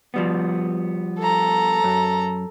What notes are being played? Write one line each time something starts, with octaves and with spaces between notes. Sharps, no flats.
F3 G3 B3
A4 A#5
F#2